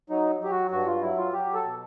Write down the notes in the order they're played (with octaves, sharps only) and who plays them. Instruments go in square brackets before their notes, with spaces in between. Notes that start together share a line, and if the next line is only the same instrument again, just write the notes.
[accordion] F#3 D#4
F#3 G4
F#4
G2 F#4
F4
F#3 E4
F4
F#3 G4
A4
B2